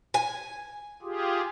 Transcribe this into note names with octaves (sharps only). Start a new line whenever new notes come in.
G#5
F4 G4 G#4